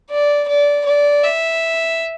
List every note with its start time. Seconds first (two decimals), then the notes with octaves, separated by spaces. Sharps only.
0.10 D5
0.48 D5
0.85 D5
1.23 E5